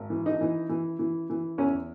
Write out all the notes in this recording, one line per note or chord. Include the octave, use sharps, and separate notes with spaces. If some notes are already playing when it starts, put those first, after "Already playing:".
Already playing: G#1
E3
D#4
E3
E3
E3
E3
E2 C#4